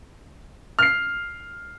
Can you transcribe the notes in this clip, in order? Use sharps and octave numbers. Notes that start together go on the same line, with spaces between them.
F6 C7